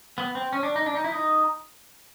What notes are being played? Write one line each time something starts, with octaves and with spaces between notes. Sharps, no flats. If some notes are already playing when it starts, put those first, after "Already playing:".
B3
C4
C#4
D4
D#4
D4
D#4
E4
D#4